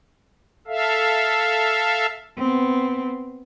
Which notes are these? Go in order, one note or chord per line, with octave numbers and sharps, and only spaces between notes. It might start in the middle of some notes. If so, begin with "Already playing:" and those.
A4 E5 F5
B3 C4